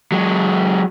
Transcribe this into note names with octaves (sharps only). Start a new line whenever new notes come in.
F#3 G#3